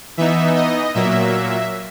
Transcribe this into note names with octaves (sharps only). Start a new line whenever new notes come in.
E3 B3 D#4 E5
D#5
A#2 F#3 A#3 E5